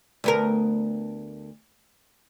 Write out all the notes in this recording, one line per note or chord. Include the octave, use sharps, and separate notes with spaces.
D2 B3 A#4